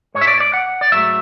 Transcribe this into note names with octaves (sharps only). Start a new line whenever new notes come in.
G#2 G#3 C#5
E5
D5
D5
F#5
D5
G#2 F#3 A3 E5